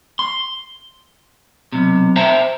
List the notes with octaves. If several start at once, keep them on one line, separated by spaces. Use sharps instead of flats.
C6
B1 C3
C5 E5 G5 A5 A#5